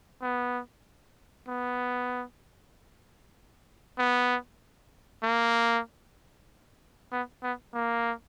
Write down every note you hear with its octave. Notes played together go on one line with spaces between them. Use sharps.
B3
B3
B3
A#3
B3
B3
A#3